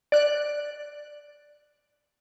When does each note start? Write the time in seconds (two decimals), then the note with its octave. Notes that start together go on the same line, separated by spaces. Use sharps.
0.12 D5 F#6